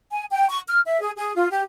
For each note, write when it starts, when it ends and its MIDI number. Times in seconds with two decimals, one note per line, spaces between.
0.12 0.24 80
0.31 0.48 79
0.49 0.60 85
0.67 0.80 89
0.86 1.00 76
1.02 1.12 68
1.16 1.36 68
1.36 1.50 65
1.51 1.62 67